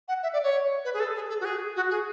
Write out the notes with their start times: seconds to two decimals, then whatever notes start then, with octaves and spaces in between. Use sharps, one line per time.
0.08 F#5
0.23 E5
0.33 D5
0.43 C#5
0.85 B4
0.94 G#4
1.00 A4
1.15 G#4
1.29 A4
1.40 F#4
1.45 G#4
1.76 F#4
1.90 G#4